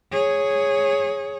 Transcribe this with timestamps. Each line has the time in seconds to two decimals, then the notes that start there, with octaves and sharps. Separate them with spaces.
0.12 G#4 C#5